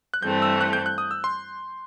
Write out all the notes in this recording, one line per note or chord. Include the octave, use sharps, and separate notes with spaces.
F#6
G2 E3 A3 C4 G6
E6
F#6
G6
F#6
D#6
E6
C6